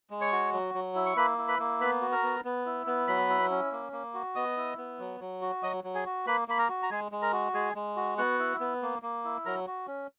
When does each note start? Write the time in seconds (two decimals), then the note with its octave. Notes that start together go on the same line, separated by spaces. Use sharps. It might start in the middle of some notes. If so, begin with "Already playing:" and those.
0.10 G#3
0.21 C#5 C#6
0.32 F#4
0.53 F#3
0.74 F#3
0.95 E4
1.06 C#6
1.17 A#3 B4 B5
1.38 E4
1.48 B4 B5
1.59 A#3
1.80 B3 B4 B5
2.02 F#4
2.12 A#4 A#5
2.23 B3
2.45 B3
2.66 E4
2.86 B3
3.07 F#3 B4 B5
3.29 E4
3.51 C#4
3.72 A#3
3.92 A#3
4.14 F#4
4.35 B3 D#5 D#6
4.57 E4
4.78 B3
4.99 F#3
5.20 F#3
5.42 F#4
5.63 F#3 D#5 D#6
5.84 F#3
5.95 G#4 G#5
6.06 F#4
6.27 A#3 B4 B5
6.48 A#3 B5
6.58 A#4 A#5
6.69 F#4
6.83 A#5
6.90 G#3 G#4 G#5
7.12 G#3
7.22 A#4 A#5
7.33 F#4
7.54 G#3 G#4 G#5
7.75 G#3
7.96 F#4
8.18 B3 F#4 F#5
8.39 E4
8.60 B3
8.82 A#3
9.02 A#3
9.25 E4
9.45 F#3 A#4 A#5
9.67 F#4
9.87 C#4